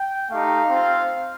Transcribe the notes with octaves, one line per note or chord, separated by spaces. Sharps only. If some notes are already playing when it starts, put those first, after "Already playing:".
Already playing: G5
A3 D#4 G4 F5
C4
F4